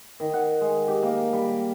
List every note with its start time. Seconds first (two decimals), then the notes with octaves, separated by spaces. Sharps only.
0.20 D#3
0.34 F#5
0.61 G#3
0.88 G4
1.03 A#3
1.33 G3